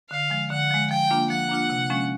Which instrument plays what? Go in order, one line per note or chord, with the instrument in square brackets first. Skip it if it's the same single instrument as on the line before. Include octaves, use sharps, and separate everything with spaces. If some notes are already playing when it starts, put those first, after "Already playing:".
[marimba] D3 [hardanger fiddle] F5
[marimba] F3 G#3
[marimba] D3 [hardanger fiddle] F#5
[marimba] F3 G#3
[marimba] F3 [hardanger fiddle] G5
[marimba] A#3 D4 F4
[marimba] F3 [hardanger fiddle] F#5
[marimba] A#3 D4 F4
C3
F3 G#3 C#4